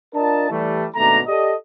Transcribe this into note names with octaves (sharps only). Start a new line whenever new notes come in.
D4 F4 A#4 D#5 A5
E3 G3 A3
G#1 B2 A3 D4 A#5
G4 A4 D5 D#5